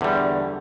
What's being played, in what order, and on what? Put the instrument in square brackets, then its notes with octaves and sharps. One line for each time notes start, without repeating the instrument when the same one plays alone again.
[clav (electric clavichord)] E2 D3 G3